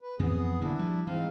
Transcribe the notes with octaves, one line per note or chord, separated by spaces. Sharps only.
B4
F2 E3 B3 C4 G#4
D#1 D3 A#3 D4 E4
F3 G3
G#2 E3 C4 F5